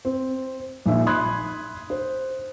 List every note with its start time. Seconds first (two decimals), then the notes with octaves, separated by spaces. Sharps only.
0.05 C4
0.86 A#1 D#3 E5
1.06 B5 C6 D#6 F#6 G#6
1.90 C5